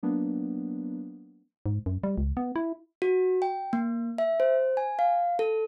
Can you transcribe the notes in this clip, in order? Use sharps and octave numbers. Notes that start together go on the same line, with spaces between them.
F#3 A#3 B3 D4
G#2
F#2
G3
C#2
B3
E4
F#4
G5
A#3
E5
C5
G#5
F5
A4